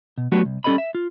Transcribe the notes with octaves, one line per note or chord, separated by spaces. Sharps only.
B2
F#3 A3 B3 D4 F#4 G4
C2
G3 C#4 A4 C#5 D#5 B5
E5
F4